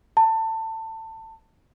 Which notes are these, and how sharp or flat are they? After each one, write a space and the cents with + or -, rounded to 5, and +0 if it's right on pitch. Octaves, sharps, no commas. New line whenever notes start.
A5 +25